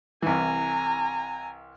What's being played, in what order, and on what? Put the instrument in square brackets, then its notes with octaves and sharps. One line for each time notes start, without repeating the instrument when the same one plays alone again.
[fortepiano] C2 E3 [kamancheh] G#5 A#5